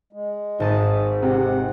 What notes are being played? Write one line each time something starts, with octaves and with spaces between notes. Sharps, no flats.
G#3
G#1 G#2 A5 D#6
C3 F#5